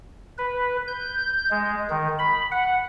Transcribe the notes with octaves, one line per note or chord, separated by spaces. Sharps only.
B4
G6
G#3
D#3
B5
F#5